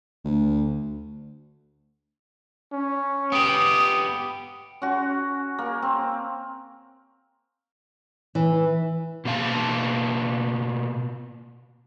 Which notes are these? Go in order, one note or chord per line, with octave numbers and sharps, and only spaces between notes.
D2
C#4
B3 G4 D#6
C#4 F#4
A#3
C4
E3
B2 A#3 F5 A5